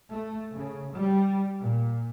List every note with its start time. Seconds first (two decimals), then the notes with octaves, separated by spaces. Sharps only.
0.11 A3
0.53 C#3
0.93 G3
1.61 A#2